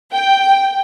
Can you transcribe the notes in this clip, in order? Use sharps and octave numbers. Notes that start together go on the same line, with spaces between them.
G5